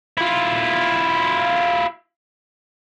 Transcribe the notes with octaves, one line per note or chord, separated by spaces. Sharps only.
E4 F4